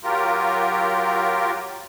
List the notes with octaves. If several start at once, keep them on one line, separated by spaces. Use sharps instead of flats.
F#3 F4 G4 A#4